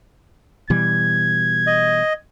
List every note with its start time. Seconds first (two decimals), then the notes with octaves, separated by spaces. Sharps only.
0.70 B2 E3 G3 G#6
1.67 D#5